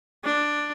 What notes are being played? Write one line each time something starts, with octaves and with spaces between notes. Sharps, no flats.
D4